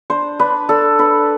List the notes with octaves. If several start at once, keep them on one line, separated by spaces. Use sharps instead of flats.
D4 C5
D4 B4
D4 A4
D4 B4